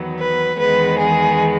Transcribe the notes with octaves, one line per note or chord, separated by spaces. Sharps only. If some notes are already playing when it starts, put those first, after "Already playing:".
Already playing: E2 D#3 F#3 B3
B4
E2 D#3 G#3 B3 B4
G#4